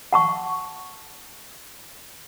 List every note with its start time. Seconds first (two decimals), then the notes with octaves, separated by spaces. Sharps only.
0.13 F#5 A5 C#6